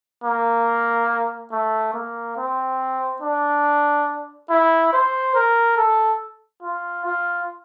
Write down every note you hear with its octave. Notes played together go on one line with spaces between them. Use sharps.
A#3
A3
A#3
C4
D4
E4
C5
A#4
A4
F4
F4